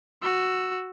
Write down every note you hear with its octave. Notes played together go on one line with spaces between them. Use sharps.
F#4 E6